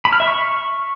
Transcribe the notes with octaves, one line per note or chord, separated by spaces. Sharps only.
B5
F6
E5
C#6